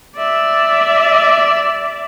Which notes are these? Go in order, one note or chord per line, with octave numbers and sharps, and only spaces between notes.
D5 E5